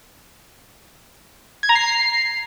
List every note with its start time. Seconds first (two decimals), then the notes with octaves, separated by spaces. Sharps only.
1.63 G#6
1.69 A#5
1.75 C7